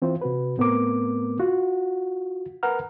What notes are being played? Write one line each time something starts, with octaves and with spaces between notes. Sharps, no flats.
E3 C4 E4 F4 C5
C3 F#4 B4
A2 A3 B3 C4 A#4 D6
F4 F#4 F#5
A#4 B4 F#5 A#5 F6